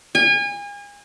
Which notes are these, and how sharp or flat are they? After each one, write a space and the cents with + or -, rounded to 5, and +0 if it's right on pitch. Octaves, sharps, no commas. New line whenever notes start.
G#5 -35